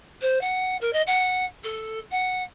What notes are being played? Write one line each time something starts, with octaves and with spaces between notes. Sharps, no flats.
C5
F#5
A#4
D#5
F#5
A4
F#5